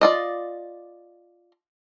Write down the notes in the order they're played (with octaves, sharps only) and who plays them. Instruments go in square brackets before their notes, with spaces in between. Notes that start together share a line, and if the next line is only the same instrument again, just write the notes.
[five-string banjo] F4 D5 D#5